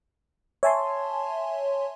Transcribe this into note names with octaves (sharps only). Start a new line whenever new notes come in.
C#5 E5 G#5 A5 C6